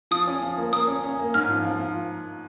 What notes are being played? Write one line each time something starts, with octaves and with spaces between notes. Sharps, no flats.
F3 D#6
C#4
F3
A#3
A#3 D#6
C#4
C#4
A#3
G#2 F6
F3
F3
F3